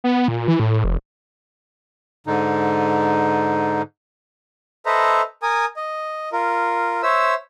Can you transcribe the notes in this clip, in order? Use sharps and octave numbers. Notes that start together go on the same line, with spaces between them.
B3
A#2
E3
A2
F1
G#2 D3 D#4
A4 B4 C5 D#5 E5 A#5
A#4 G#5 D#6
D#5
F4 A#4
C5 C#5 E5 E6